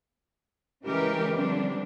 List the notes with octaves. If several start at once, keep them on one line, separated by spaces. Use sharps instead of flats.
C#3 E3 G#3 G4 A#4 B4
D3 F3 G3 C4 D4